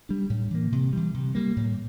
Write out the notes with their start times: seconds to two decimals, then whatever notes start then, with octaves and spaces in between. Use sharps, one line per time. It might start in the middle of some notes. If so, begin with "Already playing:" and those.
0.09 G3 D4
0.30 A2
0.51 E3 A#3
0.72 C3
0.93 E3 G3
1.14 C3
1.35 G3 A#3
1.56 A2